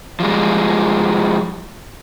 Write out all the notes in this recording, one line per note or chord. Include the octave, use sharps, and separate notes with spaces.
F3 G3 G#3